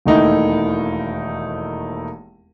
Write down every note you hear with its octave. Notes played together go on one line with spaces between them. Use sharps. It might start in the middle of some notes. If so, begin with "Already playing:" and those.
E1 D#2 D#3 A3 D#4 E4